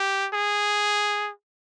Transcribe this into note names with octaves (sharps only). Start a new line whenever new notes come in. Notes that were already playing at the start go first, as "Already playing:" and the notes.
Already playing: G4
G#4